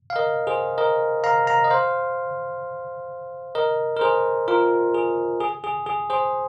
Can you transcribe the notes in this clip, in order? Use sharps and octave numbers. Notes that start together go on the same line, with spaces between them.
F5
A#4 D#5
G#4 C5
A#4 D#5
F5 A#5
F5 A#5
D#5
C5 F5
A#4 D#5
A#4
G#4 C5
F4 A#4
G#4
G#4
G#4
G#4
G#4 C5